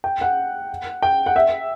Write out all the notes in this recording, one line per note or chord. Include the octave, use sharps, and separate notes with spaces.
G5
F#5
G5
F#5
E5